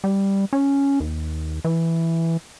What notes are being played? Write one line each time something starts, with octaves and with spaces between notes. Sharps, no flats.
G3
C#4
D#2
E3